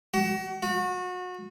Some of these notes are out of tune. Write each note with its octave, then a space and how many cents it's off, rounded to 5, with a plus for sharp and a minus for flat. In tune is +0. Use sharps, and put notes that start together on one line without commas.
F#4 +35
F#4 -30